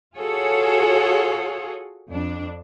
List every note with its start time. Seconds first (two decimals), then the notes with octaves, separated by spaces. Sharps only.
0.16 F4 F#4 G#4 A4 C#5
2.08 F2 D4